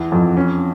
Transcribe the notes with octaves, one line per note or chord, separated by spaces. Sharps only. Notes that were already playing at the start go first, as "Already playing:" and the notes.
Already playing: E2 E4
F2
C#4